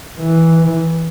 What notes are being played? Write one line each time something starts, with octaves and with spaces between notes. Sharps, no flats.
E3